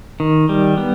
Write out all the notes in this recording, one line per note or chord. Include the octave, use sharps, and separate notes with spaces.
D#3
G3
B3